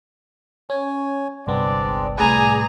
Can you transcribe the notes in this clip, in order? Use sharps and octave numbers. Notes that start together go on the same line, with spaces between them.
C#4 C#5 G#5
G1 C2 G#3 B3 C4 D4 D5
C2 A2 G#4 B4 D5 G#5 A#5